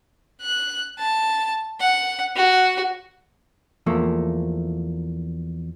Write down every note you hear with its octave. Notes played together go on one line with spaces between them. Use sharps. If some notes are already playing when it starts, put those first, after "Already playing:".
F#6
A5
F#5
F#4
E2 F3 A3 A#3